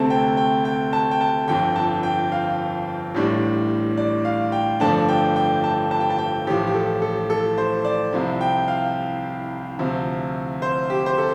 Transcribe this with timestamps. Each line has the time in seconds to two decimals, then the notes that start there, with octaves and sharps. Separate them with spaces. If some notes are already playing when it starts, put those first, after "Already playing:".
Already playing: D2 C3 A3 C4 A5
0.10 G5
0.37 G5
0.65 G5
0.93 A5
1.11 G5
1.21 A5
1.48 G1 F2 D3 G5
1.76 A5
2.03 G5
2.32 F5
3.15 A1 A2 G3 D4
3.97 D5
4.25 F5
4.52 G5
4.80 G1 F2 F3 A3 D4 A5
5.09 G5
5.36 G5
5.64 A5
5.91 A5
6.00 G5
6.10 A5
6.19 G5
6.47 A1 A2 F3 G4
6.67 G4
6.75 A4
7.02 A4
7.30 A4
7.58 C5
7.85 D5
8.13 C2 C3 F3
8.41 G5
8.68 F5
9.79 D2 C3 F3
10.62 C5
10.90 G4
11.06 C5
11.18 A4